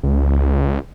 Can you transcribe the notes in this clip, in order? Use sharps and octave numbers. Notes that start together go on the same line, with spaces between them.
C#2